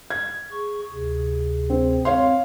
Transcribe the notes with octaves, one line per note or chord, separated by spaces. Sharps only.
G#6
G#4 C#6
D2 C3 G#4
C4
C4 C#5 F5 C6